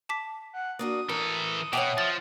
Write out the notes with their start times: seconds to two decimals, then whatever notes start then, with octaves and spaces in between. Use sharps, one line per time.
0.09 A5 D6 B6
0.53 F#5
0.79 A#3 D4 F#4 D#6
1.09 E3 A4 A#4
1.73 B2 C#5 E5 F#5 G5 D6
1.98 F3 A6